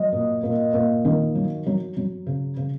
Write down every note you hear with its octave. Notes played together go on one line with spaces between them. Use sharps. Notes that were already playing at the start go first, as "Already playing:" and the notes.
Already playing: F#3 D#5
A#2
A#2
A#2
D#3
F#3
F#3
F#3
C#3
C#3